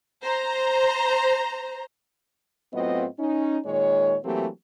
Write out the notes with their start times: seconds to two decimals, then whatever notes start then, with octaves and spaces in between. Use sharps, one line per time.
0.23 C5 A#5
2.73 A2 F#3 B3 C4 F4 D#5
3.19 C#4 D#4
3.66 A#2 D#3 G#3 C#5
4.24 E3 F#3 A3 A#3 C4 G4